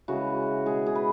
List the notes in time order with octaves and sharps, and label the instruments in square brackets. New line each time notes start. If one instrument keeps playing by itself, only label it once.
[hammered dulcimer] C#3 E3 G#3 F#4
B2 G#3 G#4
G#4
B4